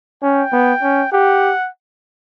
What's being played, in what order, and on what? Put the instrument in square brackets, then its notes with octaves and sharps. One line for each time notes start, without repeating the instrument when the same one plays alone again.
[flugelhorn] C#4 [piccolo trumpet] G5
[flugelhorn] B3
C#4
[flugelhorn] G4 [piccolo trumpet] F#5